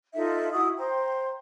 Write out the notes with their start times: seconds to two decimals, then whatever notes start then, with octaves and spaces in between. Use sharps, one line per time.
0.15 D#4 F4 A4 E5
0.52 E4 F#4 D#6
0.77 C5 G5 A#5